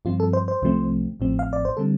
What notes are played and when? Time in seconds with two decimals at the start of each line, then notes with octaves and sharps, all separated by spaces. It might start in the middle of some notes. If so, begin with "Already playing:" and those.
0.05 G2 F3 C4 F4
0.20 A4
0.33 C5
0.48 C5
0.62 C2 C3 F3 A3 C4
1.20 A1 A2 F3 C4
1.39 F5
1.53 D5
1.65 C5
1.77 D3 G3 C4 A4